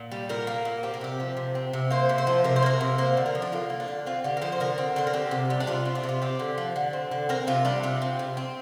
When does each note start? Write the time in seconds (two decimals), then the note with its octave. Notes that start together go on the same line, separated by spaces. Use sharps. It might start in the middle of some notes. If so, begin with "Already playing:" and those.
Already playing: A#2
0.11 G3
0.29 A#2 A#4
0.47 A#3
0.65 A#2
0.83 C4 G4
0.94 A#4
1.01 C3 G4
1.20 F3
1.37 C3
1.55 C4
1.73 C3
1.90 A#3 C5
2.09 C3
2.18 C5
2.27 F3
2.44 C3 A#4
2.56 C5
2.63 A#3 A#4
2.81 C3
2.98 A#3 C5
3.17 D3
3.26 A#4
3.35 F3
3.42 D4
3.52 D3 F4
3.70 A#3
3.80 D4
3.88 D3
4.06 C4 F4
4.24 D3 G4
4.37 A#4
4.42 F3 C5
4.52 C5
4.60 D3 A#4
4.78 C4
4.96 D3 C5
5.07 A#4
5.13 C4 G4
5.31 C3
5.50 G3
5.60 D4
5.67 C3 F4
5.85 C4
5.95 D4
6.04 C3
6.09 F4
6.22 C4 G4
6.39 D3
6.58 F3
6.76 D3
6.93 C4
7.11 D3
7.29 C4 A#4
7.47 C3 F4
7.65 G3 D4
7.83 C3 F4
8.02 C4
8.19 C3
8.37 C4